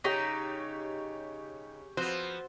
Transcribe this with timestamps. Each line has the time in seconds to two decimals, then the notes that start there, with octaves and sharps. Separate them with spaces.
0.04 C#3 D#4 G4 C#5 B6
1.97 F3 B3 C4 F#4 C5